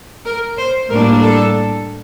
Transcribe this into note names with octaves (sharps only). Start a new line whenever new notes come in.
A#4
C5
A2 G3 A#3 D4 A#4
A4